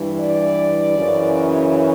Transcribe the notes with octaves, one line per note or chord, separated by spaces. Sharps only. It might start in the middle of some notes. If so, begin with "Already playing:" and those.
Already playing: G2 E3
D5
F#2 C#3 E3